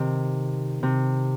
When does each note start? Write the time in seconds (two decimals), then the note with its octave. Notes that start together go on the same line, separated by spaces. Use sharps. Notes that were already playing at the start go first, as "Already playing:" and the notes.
Already playing: C3 D#3
0.83 C3